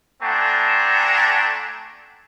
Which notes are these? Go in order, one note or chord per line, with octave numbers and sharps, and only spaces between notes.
A3 C4 D4 F#5 G#5 A#5